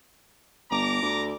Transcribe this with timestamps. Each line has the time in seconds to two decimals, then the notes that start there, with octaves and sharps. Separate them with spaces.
0.71 G1 A#5 D6
1.02 D2